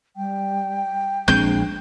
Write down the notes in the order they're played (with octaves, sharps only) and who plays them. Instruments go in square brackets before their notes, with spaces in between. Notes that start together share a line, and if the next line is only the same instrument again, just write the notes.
[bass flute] G3 [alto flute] G5
[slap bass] A#1 G#3 C4 [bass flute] D4 [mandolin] G6